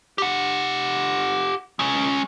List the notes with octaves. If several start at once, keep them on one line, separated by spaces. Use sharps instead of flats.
G4 F#5
G#3 C#4